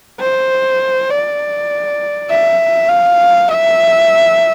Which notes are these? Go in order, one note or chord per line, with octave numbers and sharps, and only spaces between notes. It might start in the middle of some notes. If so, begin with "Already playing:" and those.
C5
D5
E5
F5
E5